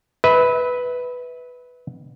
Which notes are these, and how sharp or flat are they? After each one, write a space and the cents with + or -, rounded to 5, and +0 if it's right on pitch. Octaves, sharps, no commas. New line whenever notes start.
B4 +0 E5 -35